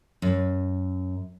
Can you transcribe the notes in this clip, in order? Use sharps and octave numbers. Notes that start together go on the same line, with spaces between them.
F#2